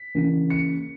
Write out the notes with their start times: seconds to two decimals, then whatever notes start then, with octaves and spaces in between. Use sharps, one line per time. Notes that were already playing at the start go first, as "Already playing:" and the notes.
Already playing: B6
0.15 C#3 E3 A#3
0.50 C#7